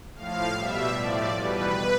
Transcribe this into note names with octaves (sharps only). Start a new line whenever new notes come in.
A2 F3 F5
B2 G3 E5
A2 F3 D5
E2 B2 G3 B4